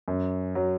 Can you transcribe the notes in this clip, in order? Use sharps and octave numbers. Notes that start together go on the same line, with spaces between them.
F#2
F#3